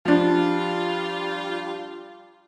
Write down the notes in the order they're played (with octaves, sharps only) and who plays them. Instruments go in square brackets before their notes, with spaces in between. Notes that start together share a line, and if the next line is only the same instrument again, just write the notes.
[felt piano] F3 D4 [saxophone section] G3 F4